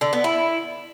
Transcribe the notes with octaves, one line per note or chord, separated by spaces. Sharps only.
D3
B3
E4